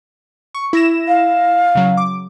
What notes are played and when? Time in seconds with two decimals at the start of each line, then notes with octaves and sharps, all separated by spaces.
0.55 C#6
0.73 E4 A#6 E7
1.08 F5
1.75 C#3 F#3
1.97 D6